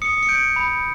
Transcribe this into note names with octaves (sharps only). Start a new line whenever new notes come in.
D#6 C#7
C#7
G6 D7
B5